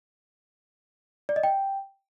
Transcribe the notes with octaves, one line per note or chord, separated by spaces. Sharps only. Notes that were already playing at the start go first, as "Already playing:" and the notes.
D5
D#5
G5